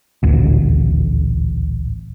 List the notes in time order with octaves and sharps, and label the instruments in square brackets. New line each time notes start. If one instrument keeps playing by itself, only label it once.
[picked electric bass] D#1 A1 D2